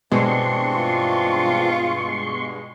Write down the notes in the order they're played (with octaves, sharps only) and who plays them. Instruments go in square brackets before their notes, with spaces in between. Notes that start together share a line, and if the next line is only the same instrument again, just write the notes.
[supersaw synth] G2 B2 G#3 [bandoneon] E3 C4 D4 [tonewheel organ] C6 C#6
[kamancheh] F4